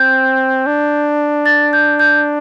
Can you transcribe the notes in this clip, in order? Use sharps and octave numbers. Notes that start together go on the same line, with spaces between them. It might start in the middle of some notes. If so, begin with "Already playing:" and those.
Already playing: C4 G6
D4
A6
G6
G6